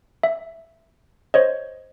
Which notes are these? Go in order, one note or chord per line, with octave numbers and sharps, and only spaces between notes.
E5
C5 C#5 D#5